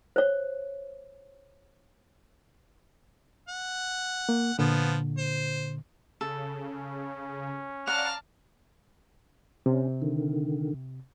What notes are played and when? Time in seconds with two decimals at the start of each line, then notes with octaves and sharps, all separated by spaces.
0.16 C5 C#5
3.49 F#5
4.29 A#3
4.59 A#2 D3 F3 B3
5.18 C5
6.21 C#3 A4
6.73 C#4
7.87 D5 F5 F#5 A5 A#5 F6
9.66 C3 C#4
10.02 D3 D#3